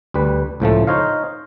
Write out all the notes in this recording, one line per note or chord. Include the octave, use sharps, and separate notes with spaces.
D2 G3 B4
C#2 A2 F3 A3
D#4 C5 C#5 D#5 F5